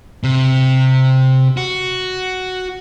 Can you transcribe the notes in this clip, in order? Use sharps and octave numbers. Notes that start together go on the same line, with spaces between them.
C3
F#4